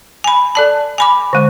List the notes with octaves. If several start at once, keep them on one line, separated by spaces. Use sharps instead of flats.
G#5 B5
A4 D5 A5
G#5 B5 D6
D3 G#3